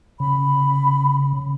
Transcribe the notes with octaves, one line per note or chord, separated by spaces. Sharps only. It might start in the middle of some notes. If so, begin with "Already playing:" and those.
C#3 B5